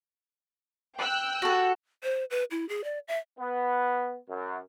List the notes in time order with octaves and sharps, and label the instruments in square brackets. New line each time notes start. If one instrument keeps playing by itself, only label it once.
[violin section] G5 E6 F#6
[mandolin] F#4 A4
[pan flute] C5
B4
E4
G#4
D5
E5
[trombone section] B3
F#2